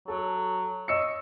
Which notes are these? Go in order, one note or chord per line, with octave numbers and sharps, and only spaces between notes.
F#3 A4
C#5 D#5 E6 C#7